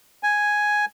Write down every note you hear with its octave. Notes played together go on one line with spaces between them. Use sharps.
G#5